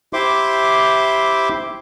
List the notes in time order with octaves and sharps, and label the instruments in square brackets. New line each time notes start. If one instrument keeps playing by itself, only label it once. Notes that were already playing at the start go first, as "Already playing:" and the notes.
[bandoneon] E4 G4 C5 E5 C6 D6